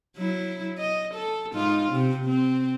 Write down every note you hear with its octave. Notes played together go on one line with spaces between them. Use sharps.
F#3 E4
D#5
A4
G#2 D#4 F4
C3 C4
C4